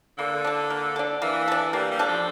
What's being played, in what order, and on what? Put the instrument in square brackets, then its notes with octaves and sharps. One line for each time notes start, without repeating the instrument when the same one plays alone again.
[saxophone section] D3 [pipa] A#3
[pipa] D4 A4
A#3
D4 A4
[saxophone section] E3 [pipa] A#3
[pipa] D4 A4
[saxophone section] G3 [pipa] A#3
[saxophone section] G3
[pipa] D4 A4
[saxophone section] F3